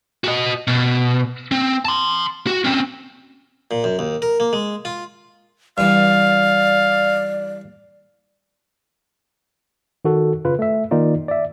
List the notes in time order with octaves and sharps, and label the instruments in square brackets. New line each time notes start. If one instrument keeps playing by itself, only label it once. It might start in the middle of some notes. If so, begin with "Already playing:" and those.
[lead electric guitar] F#4 D#5
B2
C4
A5 C6
F#4
C4 C#4
[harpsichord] A#2
F#2
D#2
A#4
A#3
G#3
F4
[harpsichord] G2 E3 [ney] D5 [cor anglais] F5
[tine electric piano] D#3 F#4 A4
C#3 F4 B4
A3 E5
D#3 A#3 D#4 F4 D5
D5 E5